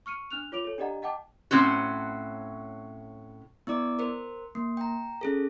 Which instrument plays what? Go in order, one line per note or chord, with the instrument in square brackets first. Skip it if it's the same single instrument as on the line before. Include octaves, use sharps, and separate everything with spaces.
[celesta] C#6 F6 C#7 D#7
D4 F6 F#6 F7
F4 C#5 D6 D7 F7
A4 C#5
D4 G4 D5 D#5 F#5 A#5
D#5 F#5 G5 A5 D6
[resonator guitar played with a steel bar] A2 C4 C#4 F#4
[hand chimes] B3 E4 D5 D6
A#4 C5
A#3
G5 A#5
C#4 G#4 A4